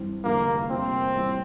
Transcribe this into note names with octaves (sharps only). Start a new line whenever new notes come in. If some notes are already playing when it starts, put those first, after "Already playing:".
Already playing: G2 E3 G3 C4
F1 E2 D3 F3 A#3
C3 G3 A#3 C4 F4 C5
A1 A2 G3